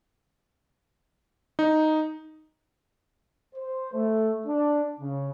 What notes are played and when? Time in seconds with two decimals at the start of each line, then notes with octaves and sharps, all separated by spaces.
1.59 D#4
3.55 C5
3.94 A3
4.47 D4
5.00 C#3